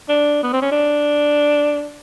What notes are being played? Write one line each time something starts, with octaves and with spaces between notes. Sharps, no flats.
D4
B3
C4
C#4
D4